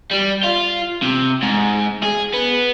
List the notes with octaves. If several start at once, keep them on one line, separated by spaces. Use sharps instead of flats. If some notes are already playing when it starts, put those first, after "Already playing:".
G3
F4
C3
G#2
G#4
B3